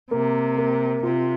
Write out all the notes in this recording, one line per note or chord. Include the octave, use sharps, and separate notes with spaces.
C3 A#3
A#3
C3 F4